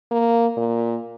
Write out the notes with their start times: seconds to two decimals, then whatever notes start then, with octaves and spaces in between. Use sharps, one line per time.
0.12 A#3
0.57 A#2